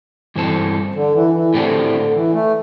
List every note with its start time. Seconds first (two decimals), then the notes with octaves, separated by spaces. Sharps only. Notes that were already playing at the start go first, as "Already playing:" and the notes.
0.35 G2 E3 C4 A4
0.95 D3
1.15 E3
1.35 E3
1.54 A2 D3 A3 C4 G4
2.14 E3
2.34 A3